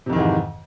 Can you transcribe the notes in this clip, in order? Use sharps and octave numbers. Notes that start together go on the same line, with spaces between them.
F2 G#2 C3 D#3 E3